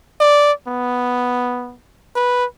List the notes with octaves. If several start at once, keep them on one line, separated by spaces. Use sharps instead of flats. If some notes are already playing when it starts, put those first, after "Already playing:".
D5
B3
B4